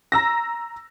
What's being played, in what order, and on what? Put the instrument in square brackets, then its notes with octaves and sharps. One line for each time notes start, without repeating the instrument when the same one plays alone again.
[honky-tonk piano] A#5 E6 A#6